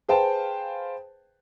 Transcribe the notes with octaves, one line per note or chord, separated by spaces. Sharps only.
G#4 B4 C5 F5 G5 A5